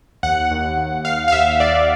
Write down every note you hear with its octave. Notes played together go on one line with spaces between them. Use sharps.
D#2 F#5
D#2
D#2
D#2 F5
F5
D#2 E5
D#2 D5